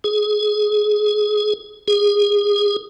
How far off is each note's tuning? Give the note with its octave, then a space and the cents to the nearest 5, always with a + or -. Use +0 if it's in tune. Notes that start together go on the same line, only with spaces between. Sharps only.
G#4 +20
G#4 -20